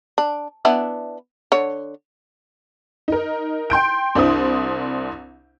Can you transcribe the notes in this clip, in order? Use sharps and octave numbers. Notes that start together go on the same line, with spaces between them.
D4
B3 D4 E4
D3 C#5
D#4 A#4
G5 C6 G6 D7
C2 D4 E4 C5 D#6